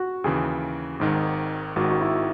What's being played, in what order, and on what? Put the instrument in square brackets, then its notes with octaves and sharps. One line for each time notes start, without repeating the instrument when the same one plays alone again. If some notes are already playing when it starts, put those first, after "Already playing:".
Already playing: [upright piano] F#4
[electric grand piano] D#2 C#3 E3 [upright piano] G#4
[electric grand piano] G#1 G#2 D#3
[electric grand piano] G#1 G#2 D#3 [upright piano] F#4
[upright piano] F#4
E4